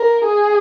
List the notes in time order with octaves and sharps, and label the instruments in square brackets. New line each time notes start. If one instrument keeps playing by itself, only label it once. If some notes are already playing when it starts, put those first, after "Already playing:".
Already playing: [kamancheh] A#4
G#4